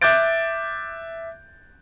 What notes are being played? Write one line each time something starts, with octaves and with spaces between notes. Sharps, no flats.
E5 D6 F#6 G6 A6 D7